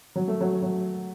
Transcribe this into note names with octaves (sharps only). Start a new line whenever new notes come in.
F#3
A3
F#3
F#3